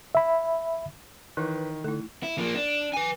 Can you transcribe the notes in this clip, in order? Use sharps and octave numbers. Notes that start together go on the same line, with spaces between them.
E5 B5
D#3 E3 E4 B4
D3 A3 D#4 E4
E4
F3 A#3
D4
B4 G#5